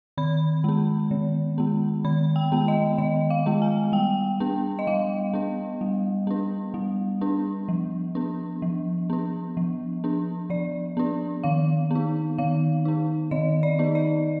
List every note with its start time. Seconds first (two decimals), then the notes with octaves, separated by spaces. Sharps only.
0.18 D#3 B5
0.64 G#3 B3
1.11 D#3
1.58 G#3 B3
2.05 D#3 B5
2.36 G5
2.52 G#3 B3
2.68 D#5
2.98 D#3 D#5
3.30 F5
3.46 G#3 B3
3.62 G#5
3.92 G3 G5
4.40 B3 D4
4.79 D#5
4.87 G3 F5
5.33 B3 D4
5.81 G3
6.27 B3 D4
6.74 G3
7.21 B3 D4
7.68 F3
8.15 B3 D4
8.62 F3
9.10 B3 D4
9.57 F3
10.04 B3 D4
10.50 F3 D5
10.97 B3 D4
11.44 D#3 F5
11.91 B3 D#4
12.38 D#3 F5
12.85 B3 D#4
13.31 D#3 D#5
13.63 D5
13.79 B3 D#4
13.95 D5